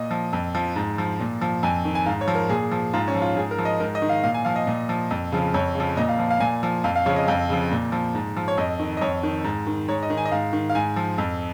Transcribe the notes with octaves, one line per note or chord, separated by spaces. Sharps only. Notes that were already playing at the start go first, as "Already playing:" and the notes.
Already playing: A#2 D#5
F3
F2
F3
G#2
F3
A#2
F3
F2 G#5
D#3
G#5
G#2 F5
C#5
F3
A#4
A#2 G#4
F3
G#2 F4
C#4
F3
F4
G#2 G#4
A#4
F3
D#5
G#2 A#4
D#5
D#3
F5
A#2 F5
G#5
F3 F5
D#5
A#2
F3
F2
C#3 F3
F2 C#5
C#3 F3
A#2 D#5
F5
F3
F5
A#2 G#5
F3
F2 F5
F5
C#3 F3 C#5
D#5
F2 F5
C#3 F3
A#2
F3
G#2
F3
C#5
F2 D#5
D#3
D#5
F2 C#5
D#3
G#2
D#3
G#2 C#5
D#5
D#3
G#5
D#5
G#2 F5
D#3
F5
G#2 G#5
F3
F2